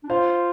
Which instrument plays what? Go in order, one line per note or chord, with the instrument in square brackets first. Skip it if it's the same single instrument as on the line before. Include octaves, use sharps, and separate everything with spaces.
[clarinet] D4
[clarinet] F4 [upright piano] C5 F5